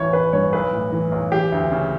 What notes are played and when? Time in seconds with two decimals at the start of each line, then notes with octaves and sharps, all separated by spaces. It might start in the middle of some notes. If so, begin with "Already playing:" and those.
Already playing: A1 E2 E3 C#5
0.13 A1 B4
0.33 G2 C#5
0.53 B1 B4
0.73 A2
0.92 E3
1.12 B1
1.32 E3 G4
1.52 D2
1.72 C#3